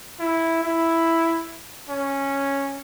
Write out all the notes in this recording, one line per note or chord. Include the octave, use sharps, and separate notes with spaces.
E4
E4
C#4